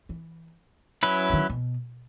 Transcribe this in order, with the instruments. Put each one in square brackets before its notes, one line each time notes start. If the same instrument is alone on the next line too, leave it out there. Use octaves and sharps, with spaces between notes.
[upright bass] E3
[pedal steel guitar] F#3 C#4 E4 B4
[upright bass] C#3
D#3
B2